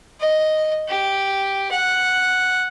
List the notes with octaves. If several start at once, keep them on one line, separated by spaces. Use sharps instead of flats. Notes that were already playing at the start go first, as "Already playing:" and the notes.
D#5
G4
F#5